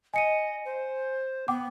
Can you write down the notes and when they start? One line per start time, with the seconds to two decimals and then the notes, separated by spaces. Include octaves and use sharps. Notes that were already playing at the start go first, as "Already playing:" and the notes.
0.14 D#5 G#5 C#7 D#7
0.65 C5
1.48 B3 F#5 G5 D6